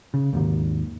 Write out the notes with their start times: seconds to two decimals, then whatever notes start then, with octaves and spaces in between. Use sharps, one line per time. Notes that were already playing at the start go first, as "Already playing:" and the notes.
0.14 C#3
0.33 D#2 G#2 D#3